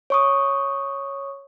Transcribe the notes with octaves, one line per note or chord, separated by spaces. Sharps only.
C#5 C#6 D#6